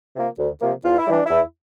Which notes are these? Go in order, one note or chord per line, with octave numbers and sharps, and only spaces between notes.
C3 F3 A#3
D2
C3 F3 A#3
E2 F4
E4
E3 G3 D4
E2 E4